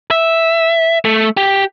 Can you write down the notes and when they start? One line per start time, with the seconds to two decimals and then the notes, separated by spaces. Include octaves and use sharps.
0.11 E5
1.05 A3
1.37 G4